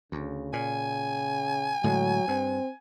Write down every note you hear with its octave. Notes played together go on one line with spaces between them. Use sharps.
D2 C#3
A#2 G#5
A2 D3 F#3 G#3
G2 C4